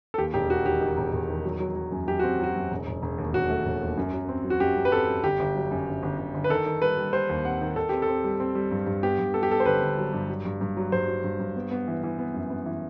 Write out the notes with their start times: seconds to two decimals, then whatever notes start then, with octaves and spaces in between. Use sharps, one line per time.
0.14 A4
0.18 D#2 G4
0.34 E1 G4
0.50 D#3 F#4
0.65 D#3 G4
0.81 D#3
0.97 E1
1.13 E1
1.29 D#3
1.45 F#3
1.60 F#3
1.76 F#3
1.92 F#2
2.08 F#2 G4
2.19 C4 F#4
2.40 F#3 F#4
2.55 F#2
2.71 E1
2.87 E1
3.02 E1
3.18 D#2
3.34 E1 F#4
3.50 A3
3.65 E1
3.82 D#2
3.97 F#2
4.13 F#3
4.29 C4
4.44 F#3
4.50 F#4
4.60 F#2 G4
4.76 F#2
4.85 B4
4.92 C4 A4
5.08 F#2
5.24 G1 G4
5.40 G1
5.56 F#3
5.71 F#2
5.87 G1
6.03 G1
6.19 G1
6.34 G1
6.44 B4
6.50 D#3 A4
6.66 D#3
6.82 G3 B4
6.97 G3
7.13 G3 C5
7.29 D#2
7.45 C4 F#5
7.61 D#3
7.76 D#3 A4
7.89 C4 G4
8.02 A4
8.08 C4
8.24 G3
8.40 C4
8.55 G3
8.71 G2
8.87 G2
9.03 B3 G4
9.19 G2
9.34 B3 A4
9.43 G4
9.50 B3 A4
9.60 C5
9.66 G1 B4
9.82 G1
9.98 F#3
10.13 G2
10.29 F#3
10.45 G2
10.61 G2
10.77 F#3
10.92 G2 C5
11.08 F#3
11.24 G2
11.40 G2
11.56 B3
11.71 B3
11.88 E3
12.03 E3
12.19 B3
12.34 F#2
12.50 B3
12.66 E3